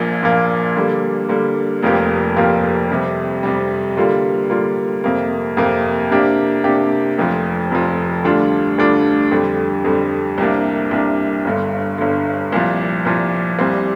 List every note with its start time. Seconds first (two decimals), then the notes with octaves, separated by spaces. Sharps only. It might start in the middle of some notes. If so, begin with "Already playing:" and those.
Already playing: A#1 A#2 F3 A#3
0.22 A#1 A#2 F3 A#3
0.76 D3 G3 A#3
1.29 D3 G3 A#3
1.83 F1 F2 F3 A#3 G4
2.36 F1 F2 F3 A#3 G4
2.90 F2 C3 G3
3.43 F2 C3 G3
3.97 D3 G3 A#3 F4
4.50 D3 G3 A#3 F4
5.04 F2 C3 A#3
5.57 F2 C3 A#3
6.11 C3 A#3 D4 G4
6.64 C3 A#3 D4 G4
7.18 F1 F2 F3
7.71 F1 F2 F3
8.24 D2 D3 G3 D4 F4
8.78 D2 D3 G3 D4 F4
9.31 F2 D3 G3
9.84 F2 D3 G3
10.38 C2 C3 A#3 D4
10.91 C2 C3 A#3 D4
11.45 G1 G2 D3
11.98 G1 G2 D3
12.52 C2 A#2 F3
13.05 C2 A#2 F3
13.59 C2 A#2 G3 C4